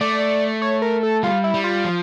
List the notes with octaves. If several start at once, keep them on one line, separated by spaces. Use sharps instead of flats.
A3 D5
C#5
A#4
A4
G3 F4
E4
G3
F4
F3